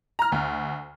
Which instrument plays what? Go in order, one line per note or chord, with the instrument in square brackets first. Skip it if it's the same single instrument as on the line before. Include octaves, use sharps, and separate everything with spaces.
[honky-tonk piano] A#5 F6
D2